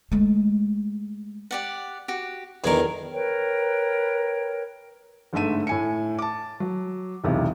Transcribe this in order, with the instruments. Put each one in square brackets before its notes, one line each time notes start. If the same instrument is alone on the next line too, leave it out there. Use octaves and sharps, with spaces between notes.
[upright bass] G#3 A3
[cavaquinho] G4 D5 F#5
F#4 G4
[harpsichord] E2 D3 D#3 [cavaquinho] G#4 A#4
[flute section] A#4 B4 C#5 G5
[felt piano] G1 G#2 D3 A3 E5 D#7
A2 G#5 C#7
A5 D6
F#3
E1 B1 E2 C3